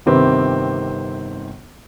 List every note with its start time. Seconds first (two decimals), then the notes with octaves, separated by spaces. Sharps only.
0.06 G1 C3 D#3 C4 G4 B4